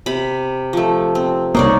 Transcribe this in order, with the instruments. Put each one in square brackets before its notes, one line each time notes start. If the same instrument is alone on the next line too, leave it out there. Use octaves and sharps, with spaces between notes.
[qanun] C3 B5
F3 A3
C4
[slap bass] C2 A#3 [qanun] D#4 C#5 D5